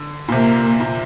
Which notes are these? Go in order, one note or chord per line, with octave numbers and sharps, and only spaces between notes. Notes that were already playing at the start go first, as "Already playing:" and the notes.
Already playing: D3
A#2
C3 A#3
A#2